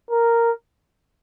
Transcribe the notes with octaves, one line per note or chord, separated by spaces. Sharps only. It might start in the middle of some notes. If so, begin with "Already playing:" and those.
A#4